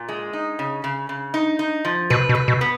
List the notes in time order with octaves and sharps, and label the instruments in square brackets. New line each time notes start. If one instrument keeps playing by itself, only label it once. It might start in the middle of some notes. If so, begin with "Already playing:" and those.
Already playing: [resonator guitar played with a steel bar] A#2
G#3
D#4
C#3
C#3
C#3
D#4
D#4
F3
[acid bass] B2 [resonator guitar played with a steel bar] B4
[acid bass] B2
[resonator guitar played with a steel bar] B4
[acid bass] B2
[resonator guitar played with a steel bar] B3